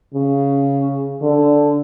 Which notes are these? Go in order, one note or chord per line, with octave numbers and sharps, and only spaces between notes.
C#3
D3